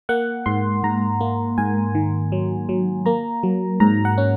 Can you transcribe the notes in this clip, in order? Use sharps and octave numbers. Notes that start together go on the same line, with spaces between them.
A#3 F#5
G#2 C6
G#2 A#5
A#3
G#2 G#5
D#3
F#3
F#3
A#3 A#5
F#3
G#2 A#5
F#5
C#4